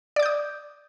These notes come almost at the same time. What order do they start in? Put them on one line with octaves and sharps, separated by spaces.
D5 D6 G6 D#6